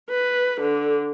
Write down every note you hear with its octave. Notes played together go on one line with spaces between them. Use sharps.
B4
D3